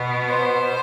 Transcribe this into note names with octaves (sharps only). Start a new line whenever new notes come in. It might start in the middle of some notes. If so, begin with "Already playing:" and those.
Already playing: B2 B3
C5